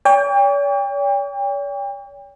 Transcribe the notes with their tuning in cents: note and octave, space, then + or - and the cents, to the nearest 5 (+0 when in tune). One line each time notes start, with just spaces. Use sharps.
C#5 +45 G5 +35